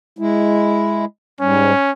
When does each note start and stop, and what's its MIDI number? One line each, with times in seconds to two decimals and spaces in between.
0.19 1.05 56
0.19 1.05 64
1.40 1.73 44
1.40 1.73 55
1.40 1.91 61